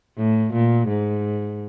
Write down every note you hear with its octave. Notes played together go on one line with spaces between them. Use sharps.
A2
A#2
G#2